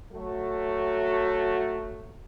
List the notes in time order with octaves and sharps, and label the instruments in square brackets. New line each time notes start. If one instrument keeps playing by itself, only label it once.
[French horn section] F#3 A3 F#4